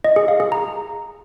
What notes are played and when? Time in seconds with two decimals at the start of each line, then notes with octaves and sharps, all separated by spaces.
0.04 D#5
0.16 G#4
0.28 F5
0.40 G#4
0.52 A#5